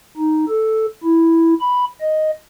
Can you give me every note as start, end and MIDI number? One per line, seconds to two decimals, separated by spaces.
0.17 0.45 63
0.48 0.86 69
1.04 1.54 64
1.61 1.85 83
2.01 2.31 75